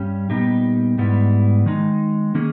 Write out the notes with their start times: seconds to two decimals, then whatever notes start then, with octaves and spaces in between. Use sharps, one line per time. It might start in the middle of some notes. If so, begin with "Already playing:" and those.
Already playing: G2 G3 C#4 G4
0.30 A#2 G3 B3 D#4 G4
0.98 G#2 G3 B3 E4
1.66 D#3 G#3 D#4
2.35 D#3 A#3 C#4 G#4